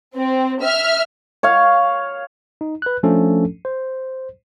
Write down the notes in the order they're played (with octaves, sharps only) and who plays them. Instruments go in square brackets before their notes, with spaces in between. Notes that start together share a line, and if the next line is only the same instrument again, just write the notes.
[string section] C4
E5 F6
[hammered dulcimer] C#5 F5
[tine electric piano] D#4
B4 F#6
F3 A3 C#4 D4 A4
C5